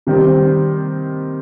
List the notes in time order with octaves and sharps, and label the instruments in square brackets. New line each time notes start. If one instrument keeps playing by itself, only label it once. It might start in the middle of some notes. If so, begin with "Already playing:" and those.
[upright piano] C3 D#3 G3 C4